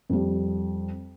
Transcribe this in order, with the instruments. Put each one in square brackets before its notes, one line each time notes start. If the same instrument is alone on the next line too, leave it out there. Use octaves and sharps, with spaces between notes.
[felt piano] F2 G3